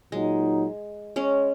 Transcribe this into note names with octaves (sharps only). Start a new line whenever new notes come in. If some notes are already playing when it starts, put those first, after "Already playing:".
A#2 F#3 G#3 D#4
G#3 C#4